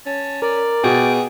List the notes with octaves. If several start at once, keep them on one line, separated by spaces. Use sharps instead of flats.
C#4 A5
A#4 D5
B2 G#4 G5